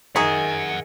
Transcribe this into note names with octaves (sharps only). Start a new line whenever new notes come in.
D#3 D#4 F#4 G#4 E5 F#5 G#5